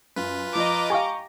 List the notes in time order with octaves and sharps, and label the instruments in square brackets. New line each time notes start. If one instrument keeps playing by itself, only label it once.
[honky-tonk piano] F#2 [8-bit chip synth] F4 B4
[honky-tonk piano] F3 [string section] D#5 A#5 D6
[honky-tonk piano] G4 C#6 A#6 [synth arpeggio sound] F5 G#5